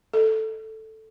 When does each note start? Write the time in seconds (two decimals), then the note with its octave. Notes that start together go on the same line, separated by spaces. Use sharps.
0.13 A4